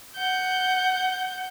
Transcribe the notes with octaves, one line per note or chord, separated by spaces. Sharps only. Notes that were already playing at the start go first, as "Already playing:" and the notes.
F#5 G6